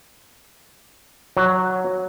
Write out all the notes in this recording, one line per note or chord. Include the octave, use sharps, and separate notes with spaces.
F#3